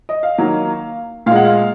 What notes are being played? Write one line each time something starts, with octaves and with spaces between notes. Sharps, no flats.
D#5
F5
D#3 F#3 A#3
A#2 G#3 F5 F#5
F5